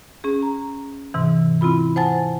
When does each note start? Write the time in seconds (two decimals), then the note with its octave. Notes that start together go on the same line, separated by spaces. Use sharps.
0.24 C#4 G#4
0.43 A#5
1.14 G#2 C3 E3
1.61 C4 E4 F4 B5
1.96 C5 F#5 G#5 A5 A6